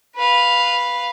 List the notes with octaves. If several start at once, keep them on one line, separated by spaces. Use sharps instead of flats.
B4 F5